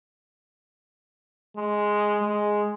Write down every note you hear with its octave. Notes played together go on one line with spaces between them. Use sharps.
G#3
G#3